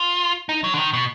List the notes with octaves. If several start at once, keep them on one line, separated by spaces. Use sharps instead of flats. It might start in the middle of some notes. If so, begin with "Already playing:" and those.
Already playing: F4
D#4
F#3
D3
D#3
B2